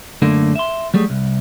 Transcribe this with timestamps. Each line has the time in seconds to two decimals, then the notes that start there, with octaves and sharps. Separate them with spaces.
0.22 F#2 D3 A3 A#3 D4
0.56 E5 C6
0.94 F#3 G3 A3 G#4
1.10 C2